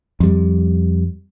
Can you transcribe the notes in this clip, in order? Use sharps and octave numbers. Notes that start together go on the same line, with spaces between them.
F2 G3